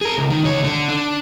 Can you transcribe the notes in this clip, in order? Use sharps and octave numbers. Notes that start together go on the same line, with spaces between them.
G#4 A#4
C#2
D#3
C#2 C#5
D3
D4